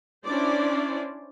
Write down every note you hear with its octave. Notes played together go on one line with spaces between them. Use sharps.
C#4 D4 E4 C5 D5